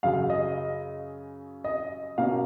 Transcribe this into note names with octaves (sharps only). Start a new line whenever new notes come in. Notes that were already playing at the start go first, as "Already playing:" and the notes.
F#2 C#3 F#3 F5
D#5
D#5
B2 A#3 C#4 F5